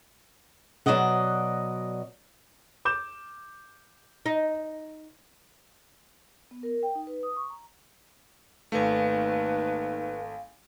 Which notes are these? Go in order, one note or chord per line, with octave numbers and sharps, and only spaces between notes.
B2 F3 F#3 D5 D#5 F#5
D6 G6 E7
D#4
B3
A#4
G5
D#4
B4
D#6
C#6
A#5
G#1 D#2 A3 B4 F5 G#5